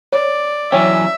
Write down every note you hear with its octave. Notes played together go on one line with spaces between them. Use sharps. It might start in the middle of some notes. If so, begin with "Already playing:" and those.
C#5 D5
E3 F#3 C#4 C#5 E5 G5